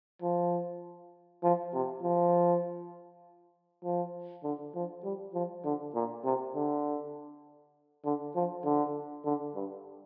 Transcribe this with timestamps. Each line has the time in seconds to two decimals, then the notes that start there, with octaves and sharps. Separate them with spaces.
0.22 F3
1.44 F3
1.74 C3
2.03 F3
3.84 F3
4.44 D3
4.75 F3
5.04 G3
5.34 F3
5.65 D3
5.95 A#2
6.25 C3
6.55 D3
8.05 D3
8.35 F3
8.65 D3
9.26 D3
9.55 G2